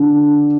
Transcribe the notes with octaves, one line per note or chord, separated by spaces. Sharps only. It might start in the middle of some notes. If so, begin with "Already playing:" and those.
Already playing: D3